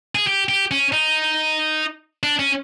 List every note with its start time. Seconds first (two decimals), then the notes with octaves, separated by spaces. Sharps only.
0.15 G#4
0.27 G4
0.49 G4
0.71 C#4
0.92 D#4
2.23 D4
2.39 C#4